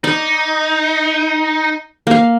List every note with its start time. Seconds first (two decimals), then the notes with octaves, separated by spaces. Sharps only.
0.04 D#4 D5
2.07 A#3 F5